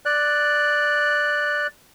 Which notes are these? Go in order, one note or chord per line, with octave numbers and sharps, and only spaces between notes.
D5 F#6